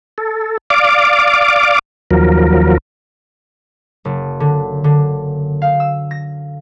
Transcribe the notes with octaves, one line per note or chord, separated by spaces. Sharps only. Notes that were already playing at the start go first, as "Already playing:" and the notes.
A4
D5 F5 D6
D#2 F3 F#3 A#4
F#1
D3
D3
F5
E6
A#6